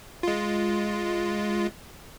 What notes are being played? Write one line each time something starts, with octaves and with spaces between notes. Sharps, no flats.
G#3 F4